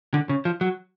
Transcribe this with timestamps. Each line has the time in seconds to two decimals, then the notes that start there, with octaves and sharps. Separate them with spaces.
0.14 D3
0.29 C#3
0.45 F3
0.61 F#3